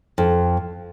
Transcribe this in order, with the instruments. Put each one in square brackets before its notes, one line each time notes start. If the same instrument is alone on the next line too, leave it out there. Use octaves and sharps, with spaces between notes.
[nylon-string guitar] F2